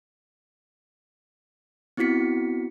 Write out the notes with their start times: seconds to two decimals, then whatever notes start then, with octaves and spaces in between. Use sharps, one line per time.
1.97 B3 C4 E4 F#4 B6 C#7